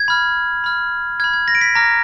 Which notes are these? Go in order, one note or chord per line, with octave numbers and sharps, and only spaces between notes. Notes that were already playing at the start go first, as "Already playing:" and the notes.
Already playing: G#6
B5 F6
B5 F6
B5 F6 G#6
G#6
A#6
D7
B6
A#5 D6 F6 A#6